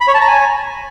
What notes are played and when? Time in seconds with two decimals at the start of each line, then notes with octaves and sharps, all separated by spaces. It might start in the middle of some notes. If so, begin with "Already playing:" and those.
0.01 B5
0.08 C#5
0.14 A5
0.21 A#5
0.28 G#5